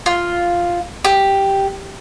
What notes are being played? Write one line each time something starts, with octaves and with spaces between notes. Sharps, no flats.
F4
G4